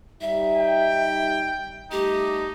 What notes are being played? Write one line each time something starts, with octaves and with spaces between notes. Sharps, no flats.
G3 D#4 E5
G5
G3 A3 D#4 G4